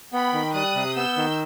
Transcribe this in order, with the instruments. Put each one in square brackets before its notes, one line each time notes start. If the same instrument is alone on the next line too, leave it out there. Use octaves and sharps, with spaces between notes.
[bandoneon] B3 [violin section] G5 B5
[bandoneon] D#3
[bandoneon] G3 [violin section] D#6 F#6
[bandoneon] C3
[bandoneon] B3 [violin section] E6 G6
[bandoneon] D#3